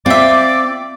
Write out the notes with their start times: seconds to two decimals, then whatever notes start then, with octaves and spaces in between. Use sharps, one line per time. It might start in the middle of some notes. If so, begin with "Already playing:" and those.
0.06 C4 F4 D5 E5 D6